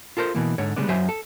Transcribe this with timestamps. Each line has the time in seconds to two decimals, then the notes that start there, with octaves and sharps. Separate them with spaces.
0.17 F4 A4 A#4 C5
0.35 B2 E3 A#3
0.58 G#2 D3 C#5
0.76 C#3 G3 G#3 B3 D4
0.88 F#2 F#3 C5 E5 G#5
1.09 A4